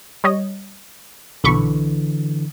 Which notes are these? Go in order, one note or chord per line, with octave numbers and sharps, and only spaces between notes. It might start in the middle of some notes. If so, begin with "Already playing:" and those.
G3 C#5 D#5
B1 D3 E3 B5 C#6